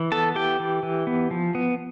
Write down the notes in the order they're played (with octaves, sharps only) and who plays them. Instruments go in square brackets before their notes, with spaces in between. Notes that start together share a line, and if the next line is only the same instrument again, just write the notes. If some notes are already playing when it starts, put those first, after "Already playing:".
Already playing: [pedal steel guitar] E3
B3 A4 A5
E3 G4 G5
E3
E3
B3
F3
B3